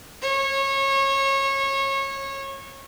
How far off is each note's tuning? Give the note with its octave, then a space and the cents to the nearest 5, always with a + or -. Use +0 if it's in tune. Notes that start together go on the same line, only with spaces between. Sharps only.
C#5 -25